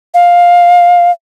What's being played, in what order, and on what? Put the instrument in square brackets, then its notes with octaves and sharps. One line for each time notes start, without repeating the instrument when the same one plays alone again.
[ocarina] F5